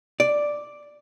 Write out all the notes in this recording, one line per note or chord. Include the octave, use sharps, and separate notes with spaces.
D5